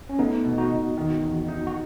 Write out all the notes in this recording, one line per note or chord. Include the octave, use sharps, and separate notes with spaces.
C#4
A3 B3 D#4
B2
D#4 F#4
B2
D#3
E2
D#4
F#4